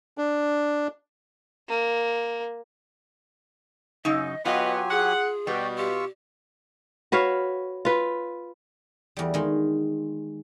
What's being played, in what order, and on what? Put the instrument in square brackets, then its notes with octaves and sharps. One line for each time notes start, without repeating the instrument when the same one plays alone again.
[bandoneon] D4
[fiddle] A#3
[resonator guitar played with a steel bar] F#2 C#3 D#4 [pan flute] D#5
[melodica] F#3 G4 G#5 [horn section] B3 [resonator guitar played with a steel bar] F4 [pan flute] D#5
[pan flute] G#4 [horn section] F#5
[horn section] B2 [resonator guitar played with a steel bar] G3 [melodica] F#4 D5 G5
[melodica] F4 C#6 E6 [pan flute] G4
[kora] F#4 B4 C#5 F5
F4 B4
[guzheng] E2 G3
D#3 G#3